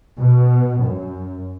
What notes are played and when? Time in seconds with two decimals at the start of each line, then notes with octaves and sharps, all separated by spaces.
0.18 B2
0.85 F#2